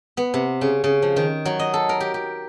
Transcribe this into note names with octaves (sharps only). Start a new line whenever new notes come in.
B3
C3
C#3
C#3
F3
D#3
F#3
D#5
A4
A#4
G4
G4